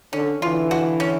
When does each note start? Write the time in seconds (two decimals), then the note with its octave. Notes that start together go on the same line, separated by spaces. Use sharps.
0.13 D3 C#4
0.42 D3 E3 F4
0.71 F#4
1.00 C#4